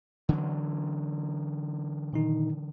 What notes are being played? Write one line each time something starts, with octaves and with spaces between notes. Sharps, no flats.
D3 E3 F#3
A#2 D#3 D#4